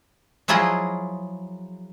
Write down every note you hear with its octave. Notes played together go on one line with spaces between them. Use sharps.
F3 F#3 E4 F4 G#4 D#5